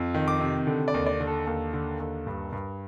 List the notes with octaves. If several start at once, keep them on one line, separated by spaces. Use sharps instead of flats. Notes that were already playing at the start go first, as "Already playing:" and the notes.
Already playing: F2
D#3
D6
C3
D3
D5
D#2
D5
D3
A4
D#2
D3
D#2
G2
G2